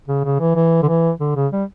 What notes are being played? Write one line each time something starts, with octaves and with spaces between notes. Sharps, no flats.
C#3
C#3
E3
E3
D3
E3
D3
C#3
G3